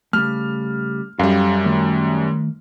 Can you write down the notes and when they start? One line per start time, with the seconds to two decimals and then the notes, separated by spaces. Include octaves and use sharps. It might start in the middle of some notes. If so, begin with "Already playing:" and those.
0.13 C#3 G3 A3 F6
1.19 F#2 G3 A4 F5
1.66 D#3 A3